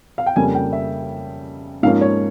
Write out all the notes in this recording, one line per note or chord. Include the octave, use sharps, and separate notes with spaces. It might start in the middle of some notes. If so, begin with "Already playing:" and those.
F5
G5
F2 C#3 G3 A#3 G#5
G5
E5
G#2 F3 A#3 C#4 F5
C#5